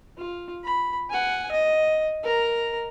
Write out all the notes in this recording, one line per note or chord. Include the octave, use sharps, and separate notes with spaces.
F4
B5
F#5 G#5
D#5
A#4 A#5